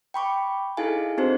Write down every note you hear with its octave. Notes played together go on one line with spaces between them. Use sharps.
G5 B5 C#6 D6
D#4 E4 G#4 A4 F5 G#5
C4 D4 D#4 F#4 C5